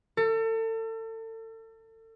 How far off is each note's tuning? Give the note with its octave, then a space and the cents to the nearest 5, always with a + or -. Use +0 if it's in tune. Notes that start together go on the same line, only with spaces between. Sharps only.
A4 +35